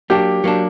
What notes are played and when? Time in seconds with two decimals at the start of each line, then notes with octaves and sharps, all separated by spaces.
0.10 F#3 A#3 D4 G4
0.44 F#3 A#3 D4